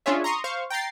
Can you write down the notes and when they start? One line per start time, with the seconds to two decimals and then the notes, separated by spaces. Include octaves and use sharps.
0.06 C#4 D4 F4 G#4 C#5 E5
0.24 A#5 C6 C#6 D#6
0.44 C5 F5 C#6
0.70 G5 A#5 A6 C7